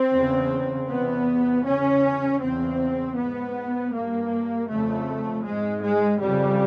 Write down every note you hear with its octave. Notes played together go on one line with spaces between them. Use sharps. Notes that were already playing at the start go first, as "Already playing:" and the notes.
Already playing: C4
E2 C#3
E2 C3 B3
E2 C#3 C#4
E2 C#3 C4
G#2 B3
G2 A#3
F2 C#3 A3
G#2 G#3
G#3
F2 C#3 G3